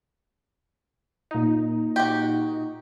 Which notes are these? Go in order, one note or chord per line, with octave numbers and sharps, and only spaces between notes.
A#2 D#4
F#4 G4